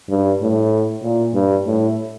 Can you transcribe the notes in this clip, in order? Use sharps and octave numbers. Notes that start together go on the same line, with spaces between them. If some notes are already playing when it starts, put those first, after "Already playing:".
G2
A2
A#2
G2
A2